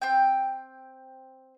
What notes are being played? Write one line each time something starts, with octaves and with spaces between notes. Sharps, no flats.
C4 G5